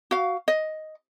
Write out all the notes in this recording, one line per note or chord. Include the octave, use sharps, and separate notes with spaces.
F#4 F5
D#5